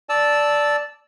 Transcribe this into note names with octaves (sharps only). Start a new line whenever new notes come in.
D5 A5 E6